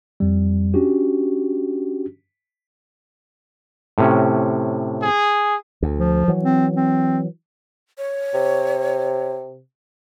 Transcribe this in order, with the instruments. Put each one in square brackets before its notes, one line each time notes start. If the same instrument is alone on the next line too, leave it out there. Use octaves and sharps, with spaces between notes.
[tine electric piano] F2 G3
C#4 D4 F#4 G4
[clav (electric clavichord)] A2 C3 C#4
[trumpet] G#4
[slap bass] D2
[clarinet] F3
[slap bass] E3 F#3
[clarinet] C4
C4
[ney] C#5
[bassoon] C3